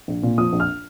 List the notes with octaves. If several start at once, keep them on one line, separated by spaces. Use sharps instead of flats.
A#1
A#2
F3 D#6
A#1
F6